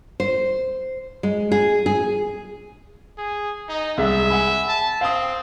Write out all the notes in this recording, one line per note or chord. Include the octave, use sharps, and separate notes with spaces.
C5
G#3
G#4
G#4
G#4
D#4
C2 G#3 E5
F#5 G#5 B5
A5
C4 F5 D#6